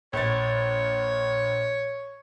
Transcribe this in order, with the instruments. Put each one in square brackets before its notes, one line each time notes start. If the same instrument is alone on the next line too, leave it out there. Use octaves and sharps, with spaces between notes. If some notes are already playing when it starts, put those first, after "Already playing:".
[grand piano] A#1 A6 [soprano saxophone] C#5